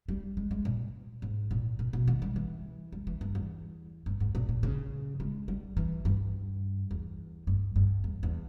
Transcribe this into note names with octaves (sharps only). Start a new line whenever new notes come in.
G3
G#3
G#3
A#2
G#2
A#2
A#2
B2
D#3
G3
E3
G3
E3
G2
E2
G2
G#2
A#2
A#2
C#3
G#3
G3
E3
G2
E2
G2
G2
E2
E2